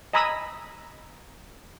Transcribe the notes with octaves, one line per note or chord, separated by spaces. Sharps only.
D#5 G#5 A#5 B5 D#6 E6